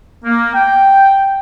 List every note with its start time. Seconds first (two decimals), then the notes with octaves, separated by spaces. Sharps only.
0.24 A#3
0.54 G5